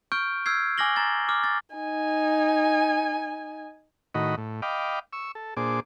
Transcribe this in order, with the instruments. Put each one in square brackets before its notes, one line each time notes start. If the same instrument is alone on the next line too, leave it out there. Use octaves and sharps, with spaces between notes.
[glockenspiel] C#6 F6 G6 D7
E6 F6 G6 G#6 C7
G#5 D6 F6 A#6 F#7 G7
A#5 A6
D6 F6
A6
[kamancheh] D#4 G#5
[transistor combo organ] A2 D#3 F#4 D#5 B5
A2
D#5 F5 G5 B5 D6
C#6 E6
A4
A#2 D4 G#4 C5 D6